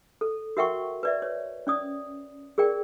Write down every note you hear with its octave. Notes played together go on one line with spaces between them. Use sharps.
A4
F#4 A#4 E5 F#5 G5 C#6
B4 D5 E5
C#5
C#4 D5 D#6
G#4 A#4 D5 G5